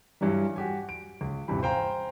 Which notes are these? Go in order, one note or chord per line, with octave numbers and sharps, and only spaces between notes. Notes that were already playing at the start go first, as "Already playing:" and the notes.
G2 E3 F#3 G3
F#4 G4 G#5
D7
C#2
D#1 G2 C3 E3 B5
C5 F5 G5 G#5 A#5